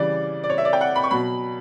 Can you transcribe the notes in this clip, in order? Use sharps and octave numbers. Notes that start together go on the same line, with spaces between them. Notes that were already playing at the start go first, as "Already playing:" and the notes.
Already playing: C#3 E3 G3 D5
D5
C#5
E5
D5
G5
F#5
B5
C#6
B2 F#3 B5